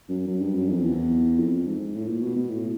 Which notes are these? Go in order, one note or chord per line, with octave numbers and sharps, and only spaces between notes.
F#2
F#2
G2
F#2
F2
E2
F2
G#2
A2
A#2
B2
B2
A2